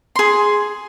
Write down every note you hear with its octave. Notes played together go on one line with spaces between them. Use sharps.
G#4 C6